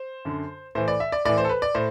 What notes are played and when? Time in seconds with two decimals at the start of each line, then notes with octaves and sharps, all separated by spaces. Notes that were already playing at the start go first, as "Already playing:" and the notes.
Already playing: C5
0.25 F#2 D3
0.75 A2 E3 C5
0.88 D5
1.00 E5
1.12 D5
1.25 A2 E3 D5
1.38 C5
1.45 A4
1.49 B4
1.62 D5
1.75 A2 C5